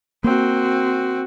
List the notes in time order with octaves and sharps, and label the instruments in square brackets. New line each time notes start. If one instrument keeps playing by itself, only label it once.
[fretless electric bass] A#3 [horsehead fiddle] C4 F#4